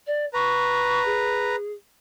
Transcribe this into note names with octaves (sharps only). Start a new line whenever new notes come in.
D5
B4 A#5 C#6
G#4